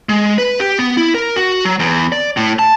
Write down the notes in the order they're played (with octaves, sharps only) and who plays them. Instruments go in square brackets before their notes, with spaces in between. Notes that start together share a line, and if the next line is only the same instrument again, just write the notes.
[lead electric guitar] G#3
B4
G4
B3
E4
A#4
F#4
F#3
E2
D5
A2
A5